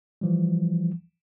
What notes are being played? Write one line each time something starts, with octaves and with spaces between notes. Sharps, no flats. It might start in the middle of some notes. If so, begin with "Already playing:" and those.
E3 F3 G3